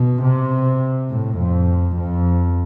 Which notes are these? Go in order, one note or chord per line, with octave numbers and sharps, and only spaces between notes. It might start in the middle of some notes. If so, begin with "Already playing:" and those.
Already playing: B2
C3
A2
F2
F2